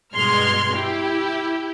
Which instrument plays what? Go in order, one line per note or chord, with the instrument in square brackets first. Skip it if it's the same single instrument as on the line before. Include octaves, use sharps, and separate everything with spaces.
[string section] G2 B2 G#3 C6 F6 G#6
E4 G4